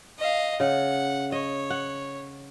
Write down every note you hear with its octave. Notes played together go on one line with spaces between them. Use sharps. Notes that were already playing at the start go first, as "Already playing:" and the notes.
D#5 F5
C#3 F#5
C#5 D#5
F#5